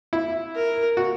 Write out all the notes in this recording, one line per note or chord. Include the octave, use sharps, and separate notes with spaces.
E4
A#4
F#4